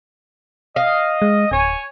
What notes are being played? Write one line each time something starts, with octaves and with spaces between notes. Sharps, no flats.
D#5 F5
G#3
D1 C#5 G#5